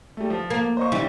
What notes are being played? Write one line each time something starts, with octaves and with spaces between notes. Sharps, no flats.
G3 A3
F3
A#3
C5 D#5 C#6
E3 G3 C#4 E4